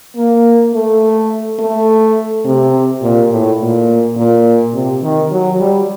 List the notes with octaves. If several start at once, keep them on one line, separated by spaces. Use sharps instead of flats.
A#3
A3
A3
C3
A#2
A2
A#2
A#2
C3
D#3
F#3
G3